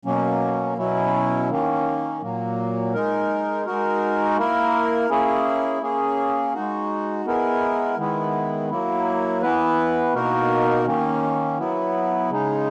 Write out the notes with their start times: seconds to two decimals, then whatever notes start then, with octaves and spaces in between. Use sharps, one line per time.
0.05 B2 F#3 A#3 C#4
0.77 B2 F#3 C#4 E4
1.50 D#3 A#3 C#4
2.21 A#2 F#3 A#3
2.93 G#3 D#4 A#4
3.65 G#3 D#4 F#4 A#4
4.37 A#3 E4 A#4
5.10 A#3 C#4 E4 G#4
5.81 A#3 C#4 G#4
6.54 G#3 D#4 F#4
7.26 G#3 B3 E4 A#4
7.98 D#3 G#3 B3 E4
8.70 F#3 A#3 E4
9.42 E3 B3 E4 B4
10.14 B2 A#3 D#4 F#4 A#4
10.86 D#3 A#3 C#4
11.58 F#3 B3 E4
12.30 C#3 G#3 D#4